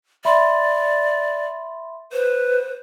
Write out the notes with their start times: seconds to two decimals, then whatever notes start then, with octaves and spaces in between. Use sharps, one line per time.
0.25 D5 E5 B5 C6
2.12 B4 C5